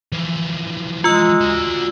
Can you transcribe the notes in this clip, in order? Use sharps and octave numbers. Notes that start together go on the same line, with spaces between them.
E3 F3
G#3 F4 E6
D4 F#4